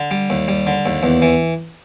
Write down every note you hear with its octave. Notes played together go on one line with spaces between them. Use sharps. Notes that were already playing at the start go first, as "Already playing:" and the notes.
Already playing: D3
G3
D#2
G3
D3
D#2
E2
E3